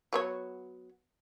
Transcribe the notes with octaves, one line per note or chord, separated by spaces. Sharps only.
F#3 B3 C#5